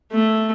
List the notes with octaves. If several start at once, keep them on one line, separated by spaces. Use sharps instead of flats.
A3